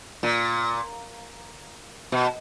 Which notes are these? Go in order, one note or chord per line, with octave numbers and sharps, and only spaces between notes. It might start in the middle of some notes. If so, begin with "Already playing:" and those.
A#2
B2